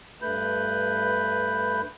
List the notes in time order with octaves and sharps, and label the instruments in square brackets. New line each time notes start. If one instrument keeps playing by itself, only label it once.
[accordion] G2 A3 B4 B5 G6